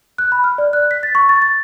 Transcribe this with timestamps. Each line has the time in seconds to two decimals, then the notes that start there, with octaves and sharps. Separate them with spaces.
0.18 F#6
0.32 B5
0.44 F6
0.58 D5
0.73 F#6
0.91 B6
1.03 A6
1.15 C#6
1.29 A6
1.42 A6